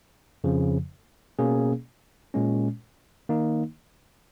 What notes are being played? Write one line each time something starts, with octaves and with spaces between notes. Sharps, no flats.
F2 C#3 F3
B2 A#3 C#4 G#4
A#2 G#3 C#4
D#3 A#3 D#4